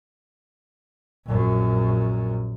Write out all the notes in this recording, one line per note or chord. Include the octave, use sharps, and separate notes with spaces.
A#1 F#2